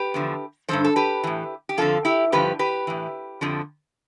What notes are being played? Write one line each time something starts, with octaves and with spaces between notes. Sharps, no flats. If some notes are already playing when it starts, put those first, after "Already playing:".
Already playing: G4 B4
E2 D3 F3
G2 D3 F3 A4 C5
A4
G4 B4
A2 E3
G4
F2 D3 F3 F4 A4
E4 G4
G2 D3 F3 G4 B4
G4 B4
A2 E3
F2 D3 F3